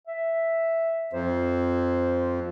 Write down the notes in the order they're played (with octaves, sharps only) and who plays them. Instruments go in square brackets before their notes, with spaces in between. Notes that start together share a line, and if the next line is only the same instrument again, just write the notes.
[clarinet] E5
[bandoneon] F2 [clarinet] C5